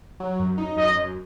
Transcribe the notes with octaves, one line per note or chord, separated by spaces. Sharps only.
F#3
F#2
D#4
F#2 D#5
F#2